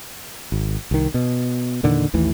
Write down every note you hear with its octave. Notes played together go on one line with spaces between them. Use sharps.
G#1
C2 D#3
B2
E2 A#2 D3 D#3
A1 D#2 A2 E3